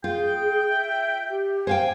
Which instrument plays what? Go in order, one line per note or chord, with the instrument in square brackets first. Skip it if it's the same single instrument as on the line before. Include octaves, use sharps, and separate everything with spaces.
[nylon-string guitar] F4 [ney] G#4 [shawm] G5
[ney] E5
G4
[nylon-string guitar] C5 F5 G5 [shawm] G#5